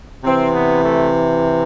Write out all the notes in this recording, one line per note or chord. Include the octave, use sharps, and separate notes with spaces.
C3 E3 C4
B3
A3